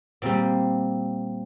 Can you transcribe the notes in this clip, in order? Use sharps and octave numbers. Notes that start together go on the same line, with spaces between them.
A#2 G3 C4